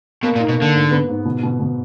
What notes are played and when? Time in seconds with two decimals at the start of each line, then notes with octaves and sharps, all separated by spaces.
0.23 B2 A#3
0.35 A#2
0.40 D#4
0.49 B2
0.58 D3 A#3
0.74 G#2
0.91 B3
1.08 G#2
1.25 B2
1.43 B2
1.60 B2